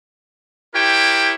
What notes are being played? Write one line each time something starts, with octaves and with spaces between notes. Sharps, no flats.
E4 G4 A#4 C#5 G5